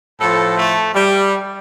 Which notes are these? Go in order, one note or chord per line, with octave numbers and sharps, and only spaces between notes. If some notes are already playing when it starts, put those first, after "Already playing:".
A2 F3 A4
A3
G3